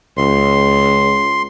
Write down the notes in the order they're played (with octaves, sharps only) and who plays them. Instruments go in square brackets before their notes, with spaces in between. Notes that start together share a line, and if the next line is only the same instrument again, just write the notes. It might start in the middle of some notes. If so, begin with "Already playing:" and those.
[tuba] C#2 [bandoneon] C6